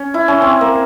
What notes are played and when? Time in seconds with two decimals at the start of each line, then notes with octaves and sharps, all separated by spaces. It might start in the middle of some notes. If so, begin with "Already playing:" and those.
Already playing: C#4
0.14 E4
0.28 C#4
0.42 C4
0.61 A#3